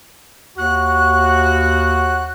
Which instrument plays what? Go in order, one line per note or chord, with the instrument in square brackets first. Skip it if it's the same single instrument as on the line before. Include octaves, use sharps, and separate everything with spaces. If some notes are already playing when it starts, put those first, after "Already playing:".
[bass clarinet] D#2 [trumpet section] F#4 [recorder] F#6